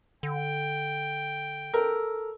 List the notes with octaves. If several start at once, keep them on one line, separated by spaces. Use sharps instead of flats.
D3 G5
A4 A#4